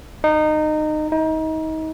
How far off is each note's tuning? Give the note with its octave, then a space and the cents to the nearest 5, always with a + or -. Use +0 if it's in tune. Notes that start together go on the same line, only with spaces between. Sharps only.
D#4 -20
D#4 +30